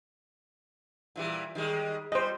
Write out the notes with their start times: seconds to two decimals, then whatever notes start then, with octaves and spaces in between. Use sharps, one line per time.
1.16 A#2 E3 G3
1.55 D#3 G3 G#3
2.12 G3 C5 D#5